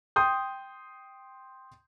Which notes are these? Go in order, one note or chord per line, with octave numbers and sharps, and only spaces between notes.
G5 C6 D#6 G6